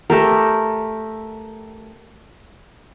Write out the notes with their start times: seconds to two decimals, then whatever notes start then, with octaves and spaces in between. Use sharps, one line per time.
0.10 A3 G4 A#4